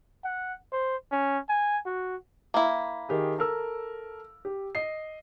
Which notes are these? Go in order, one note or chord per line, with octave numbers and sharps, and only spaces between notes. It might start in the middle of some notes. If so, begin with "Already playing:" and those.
F#5
C5
C#4
G#5
F#4
A#3 E4
D#3 G4 G#4
A4 A#4 E6
G4
D#5 C7